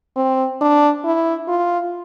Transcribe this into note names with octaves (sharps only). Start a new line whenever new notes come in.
C4
D4
E4
F4